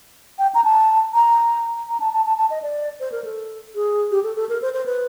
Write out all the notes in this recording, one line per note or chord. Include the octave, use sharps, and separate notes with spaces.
G5
A#5
A5
A#5
A#5
A5
A5
A5
A5
D#5
D5
C5
A#4
A4
G#4
G4
A4
A4
A#4
C5
C5
B4